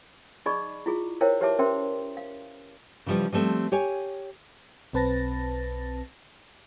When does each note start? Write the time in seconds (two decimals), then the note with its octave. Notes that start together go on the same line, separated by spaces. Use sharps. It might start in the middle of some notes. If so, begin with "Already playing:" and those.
0.46 D#4 G#4 D5 D#5 B5 C#6
0.86 E4 F4 G#4
1.21 E4 A#4 C5 C#5 F5 G5
1.41 G4 B4 C#5 E5 A5 D6
1.59 C#4 A#4 C5 E5 G5 C6
2.17 F5
3.06 C#3 E3 F3 G3
3.32 F3 G3 A3 C4
3.72 G4 C#5 G#5
4.93 B1 C4 B4 A5 A6 A#6